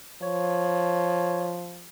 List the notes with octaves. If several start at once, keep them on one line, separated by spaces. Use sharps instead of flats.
F3 C#5